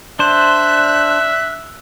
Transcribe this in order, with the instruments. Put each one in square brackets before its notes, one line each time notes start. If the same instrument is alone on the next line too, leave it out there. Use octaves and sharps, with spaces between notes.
[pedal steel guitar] D4 C5 [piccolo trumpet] E5 [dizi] F#6